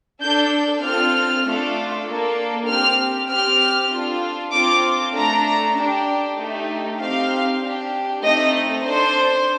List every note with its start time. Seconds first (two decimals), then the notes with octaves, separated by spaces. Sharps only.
0.22 D4 A4 G6
0.84 C4 F4 A4 F6
1.45 A3 D4 F4 A4
2.07 A#3 D4 A4
2.68 C4 G4 F6
3.30 C4 G4 F6
3.92 D4 F4 A4
4.53 C4 F4 A4 D6
5.15 A3 D4 A4 A#5
5.76 D4 G4
6.38 A3 D#4 G4
7.00 C4 D#4 G4 F5
7.61 D4 G4
8.23 A3 C4 D#4 A4 D#5
8.85 D4 A4 C5